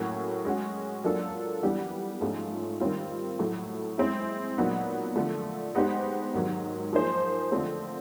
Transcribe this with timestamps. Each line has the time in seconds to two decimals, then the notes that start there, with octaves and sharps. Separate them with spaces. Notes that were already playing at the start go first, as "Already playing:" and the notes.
Already playing: A2 F#3 A#3 C#4 F#4
0.45 G#3 C#4 F#4
1.04 F#3 A#3 D4 F4 A4
1.62 E3 G3 B3 D4 G4
2.21 G#2 F3 A3 C#4 F4
2.80 D#3 G3 C4 F4
3.39 A2 F#3 A3
3.98 G#3 C4 E4
4.57 A#2 F#3 B3 D#4
5.16 D3 F3 A3
5.75 G#3 B3 D#4 G4 C5
6.34 G#2 D#3 F#3
6.93 F3 A#3 D#4 G#4 C5
7.52 D3 F3 A3 C4